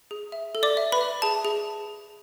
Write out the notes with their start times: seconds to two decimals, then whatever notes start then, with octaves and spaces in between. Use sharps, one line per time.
0.11 G#4
0.32 E5
0.55 A4
0.63 D5 D6
0.77 E5
0.92 B4 B5
1.01 E5
1.22 G#4 A5
1.45 G#4